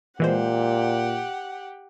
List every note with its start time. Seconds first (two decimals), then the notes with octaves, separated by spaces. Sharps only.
0.20 A#2 E3 G#3 G4 C5 F#5